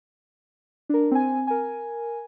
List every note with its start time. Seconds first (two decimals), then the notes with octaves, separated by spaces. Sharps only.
0.89 D4 A#4
1.11 C4 G#5
1.47 A#4 G#5